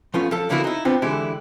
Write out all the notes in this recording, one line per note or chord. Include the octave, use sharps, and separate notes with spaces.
F3 A3 B3 C#4 F4
F3 A4
D3 F3 A#3 B3 E4 F#4
D#4 E4
B3 C4 D4 F4 C5
D3 E3 G#3 E4 G4